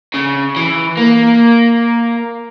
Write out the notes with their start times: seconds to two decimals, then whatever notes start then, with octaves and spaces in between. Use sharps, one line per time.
0.14 C#3
0.56 E3
0.97 A#3